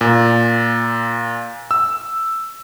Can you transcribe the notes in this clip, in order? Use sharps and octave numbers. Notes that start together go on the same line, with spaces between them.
A#2
E6